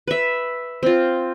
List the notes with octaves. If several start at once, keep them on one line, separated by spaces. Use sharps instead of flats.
B4 E5
C4 F4